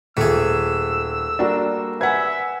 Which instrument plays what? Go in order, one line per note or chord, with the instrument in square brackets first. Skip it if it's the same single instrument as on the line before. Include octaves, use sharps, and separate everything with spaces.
[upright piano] D#1 [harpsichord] A3 G#4 [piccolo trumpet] E6
[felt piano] G3 A#3 F#4 [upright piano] D4
[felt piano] B4 F#5 G#5 [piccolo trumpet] E5 [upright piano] G#6